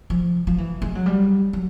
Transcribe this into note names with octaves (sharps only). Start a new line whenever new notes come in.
F3
F3
E3
G#3
F#3
G3
F#3